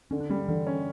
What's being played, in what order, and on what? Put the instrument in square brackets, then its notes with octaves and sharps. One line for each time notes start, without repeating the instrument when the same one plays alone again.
[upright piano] D3 [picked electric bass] C#4
[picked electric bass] D4
[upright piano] G3 [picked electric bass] C#4
[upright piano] D3 [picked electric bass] E3
[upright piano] C#4